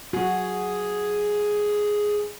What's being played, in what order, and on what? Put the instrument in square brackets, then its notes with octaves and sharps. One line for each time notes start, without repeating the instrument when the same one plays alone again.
[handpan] F#4 [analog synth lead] G#4